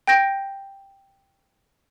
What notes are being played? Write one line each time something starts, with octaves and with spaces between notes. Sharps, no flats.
G5 G6 A#6 D7